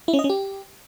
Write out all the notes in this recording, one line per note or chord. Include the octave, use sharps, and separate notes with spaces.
E4
C#4
D#5
C#4
G4